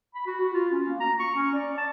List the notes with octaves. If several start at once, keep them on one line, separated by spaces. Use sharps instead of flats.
B5
F#4
F#4
F4
C#4
A#3
A#5
C#6
C#4
D5
A5